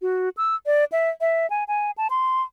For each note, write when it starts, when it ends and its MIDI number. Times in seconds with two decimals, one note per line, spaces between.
0.02 0.29 66
0.37 0.55 88
0.66 0.84 74
0.92 1.10 76
1.21 1.49 76
1.50 1.64 80
1.68 1.91 80
1.98 2.07 81
2.10 2.43 84